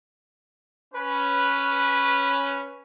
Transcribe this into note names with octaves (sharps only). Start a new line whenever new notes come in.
C#4 B4